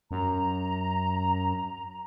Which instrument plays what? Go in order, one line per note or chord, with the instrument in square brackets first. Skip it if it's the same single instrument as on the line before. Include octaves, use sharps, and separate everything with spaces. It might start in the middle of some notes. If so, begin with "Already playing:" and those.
[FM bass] F#2 [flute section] A#5